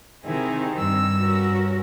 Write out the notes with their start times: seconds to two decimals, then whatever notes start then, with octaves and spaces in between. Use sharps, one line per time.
0.25 C3 D#3 C4 E4 G#4
0.78 G2 E6
1.20 C#4 F#4 A#4